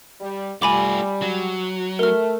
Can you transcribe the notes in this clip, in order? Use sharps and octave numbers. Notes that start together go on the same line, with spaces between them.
G3
G3 A3 F4 G#5 B5 D6
F#3
A3 A#4 F6